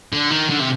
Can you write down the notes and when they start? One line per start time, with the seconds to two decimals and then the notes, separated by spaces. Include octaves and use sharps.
0.13 D3
0.31 D#3
0.50 D3
0.61 C3